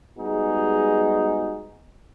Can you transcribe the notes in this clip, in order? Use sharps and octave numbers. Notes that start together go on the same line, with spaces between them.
G3 G#3 B3 D#4 F#4 G#4